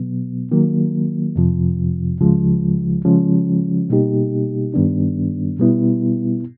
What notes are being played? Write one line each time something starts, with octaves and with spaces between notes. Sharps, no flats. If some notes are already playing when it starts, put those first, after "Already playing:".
Already playing: B2 F#3 B3
D#3 F#3 A#3
F2 C3 F3
C#2 C#3 F3 G#3
C#3 F3 G#3 C#4
B2 G3 A#3 D#4 G4
G2 D#3 G3 B3 D4
B2 G3 B3 E4